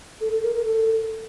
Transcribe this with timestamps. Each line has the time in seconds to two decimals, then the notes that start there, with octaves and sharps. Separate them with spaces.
0.21 A4
0.32 A4
0.43 A#4
0.54 A#4
0.65 A4